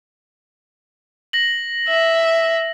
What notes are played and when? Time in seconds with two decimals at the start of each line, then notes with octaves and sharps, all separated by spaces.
1.33 A#6 F#7
1.87 E5